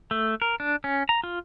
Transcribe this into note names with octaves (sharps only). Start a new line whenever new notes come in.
A3
A#4
D4
C#4
A#5
F4